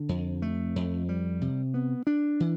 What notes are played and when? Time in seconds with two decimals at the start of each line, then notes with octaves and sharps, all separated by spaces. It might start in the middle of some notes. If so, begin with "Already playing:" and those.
Already playing: D3
0.09 F2
0.42 A3
0.76 F2
1.09 G3
1.41 C3
1.74 B3
2.07 D4
2.40 E3